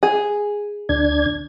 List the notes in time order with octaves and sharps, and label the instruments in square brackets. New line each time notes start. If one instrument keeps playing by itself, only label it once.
[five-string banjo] G#4
[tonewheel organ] D2 D4 G#6